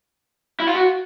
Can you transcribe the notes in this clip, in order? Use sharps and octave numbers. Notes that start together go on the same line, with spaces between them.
E4
F4
F#4